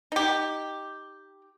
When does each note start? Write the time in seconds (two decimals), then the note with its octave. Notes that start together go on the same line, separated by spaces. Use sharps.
0.12 D#4 G4